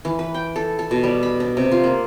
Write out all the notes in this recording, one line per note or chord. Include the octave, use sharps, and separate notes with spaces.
E3
B4
G5
A4
A4
B2
G3
B5
D4
C3
F4
A#3